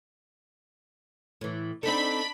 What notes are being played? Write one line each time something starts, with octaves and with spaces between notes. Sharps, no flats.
A2 E3
C4 D4 D#4 A4 B5